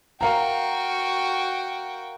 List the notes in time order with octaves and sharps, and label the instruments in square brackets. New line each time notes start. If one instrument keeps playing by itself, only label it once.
[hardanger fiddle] F#4 G5 [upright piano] A#4 F5 A#5